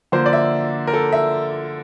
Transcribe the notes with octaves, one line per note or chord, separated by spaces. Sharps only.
D3 F3 A#3 C5
D5
E5
A#4
A4
E5